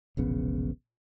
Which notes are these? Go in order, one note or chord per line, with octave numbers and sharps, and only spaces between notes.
E1 A#1 C#3 B3